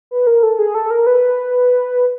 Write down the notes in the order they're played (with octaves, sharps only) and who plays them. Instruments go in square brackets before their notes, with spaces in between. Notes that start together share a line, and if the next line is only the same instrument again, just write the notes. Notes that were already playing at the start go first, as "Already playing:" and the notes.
[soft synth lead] B4
A#4
A4
G#4
A4
A#4
B4